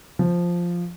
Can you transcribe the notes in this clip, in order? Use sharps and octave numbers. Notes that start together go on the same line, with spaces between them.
F3